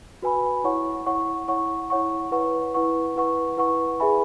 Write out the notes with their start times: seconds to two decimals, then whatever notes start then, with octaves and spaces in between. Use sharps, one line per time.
0.22 F#4 B4 G#5 B5
0.64 E4 C#5 F#5 C#6
1.06 E4 C#5 F#5 C#6
1.48 E4 C#5 F#5 C#6
1.90 E4 C#5 F#5 C#6
2.31 E4 B4 F#5 C#6
2.74 E4 B4 F#5 C#6
3.16 E4 B4 F#5 C#6
3.57 E4 B4 F#5 C#6
4.00 G#4 B4 E5 G#5 B5